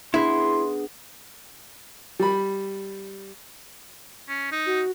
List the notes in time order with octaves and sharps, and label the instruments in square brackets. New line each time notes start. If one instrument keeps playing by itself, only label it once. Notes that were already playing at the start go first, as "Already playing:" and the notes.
[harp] B3 D4 G#4 [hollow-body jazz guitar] E4 [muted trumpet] C6
[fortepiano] G3 B5
[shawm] C#4
D#4
[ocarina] F#4